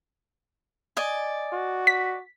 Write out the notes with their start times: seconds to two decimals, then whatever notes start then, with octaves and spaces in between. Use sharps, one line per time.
0.97 D5 D#5 G#5
1.53 F#4
1.87 B6